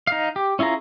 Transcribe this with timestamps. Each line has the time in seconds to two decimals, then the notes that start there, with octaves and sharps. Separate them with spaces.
0.07 D#4 F5
0.36 G4
0.59 C#4 E4 F4 G#4 A#5